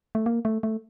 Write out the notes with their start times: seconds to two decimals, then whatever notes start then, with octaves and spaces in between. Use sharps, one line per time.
0.15 A3
0.26 A#3
0.45 A3
0.63 A3